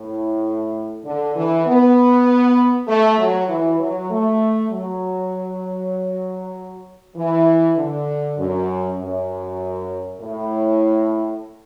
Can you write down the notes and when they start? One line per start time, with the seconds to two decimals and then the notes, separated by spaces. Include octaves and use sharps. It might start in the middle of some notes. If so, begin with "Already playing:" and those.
Already playing: A2
1.05 D3
1.35 E3
1.65 B3
2.88 A3
3.18 F#3
3.49 E3
3.80 F#3
4.10 A3
4.71 F#3
7.16 E3
7.77 D3
8.38 F#2
8.99 F#2
10.21 A2